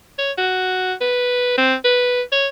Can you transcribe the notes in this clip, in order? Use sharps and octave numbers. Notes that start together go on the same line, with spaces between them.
C#5
F#4
B4
C4
B4
C#5